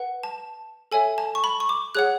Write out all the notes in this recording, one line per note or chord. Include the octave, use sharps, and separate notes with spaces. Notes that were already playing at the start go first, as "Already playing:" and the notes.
Already playing: B4 F#5
A5
A4 C#5 E5 G#5
A5
C#6
B5
C#6
D6
G#4 C#5 F#5 F#6